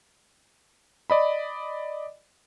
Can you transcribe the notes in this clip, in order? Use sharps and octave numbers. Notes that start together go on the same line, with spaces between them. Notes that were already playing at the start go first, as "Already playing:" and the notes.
D5 D#5 B5